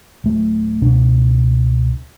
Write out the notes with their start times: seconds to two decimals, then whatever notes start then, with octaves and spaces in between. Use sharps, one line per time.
0.24 D1 A3
0.81 C#2 B2 D4